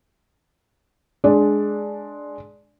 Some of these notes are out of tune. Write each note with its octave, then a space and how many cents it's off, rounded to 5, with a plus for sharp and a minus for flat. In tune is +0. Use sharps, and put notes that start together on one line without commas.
G#3 +10 D4 +0 D5 +0